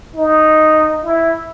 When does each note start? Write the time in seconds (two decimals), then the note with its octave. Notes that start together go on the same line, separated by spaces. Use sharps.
0.15 D#4
1.05 E4